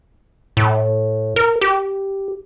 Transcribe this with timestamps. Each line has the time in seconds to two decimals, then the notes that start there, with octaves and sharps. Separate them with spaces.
0.57 A2
1.36 A#4
1.61 G4